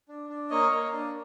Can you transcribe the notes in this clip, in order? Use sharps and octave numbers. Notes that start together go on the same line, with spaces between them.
D4
D4
A#3 C#5 D#5
A#3
D4